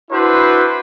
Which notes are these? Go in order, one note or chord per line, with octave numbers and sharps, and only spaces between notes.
D4 E4 F#4 B4 C5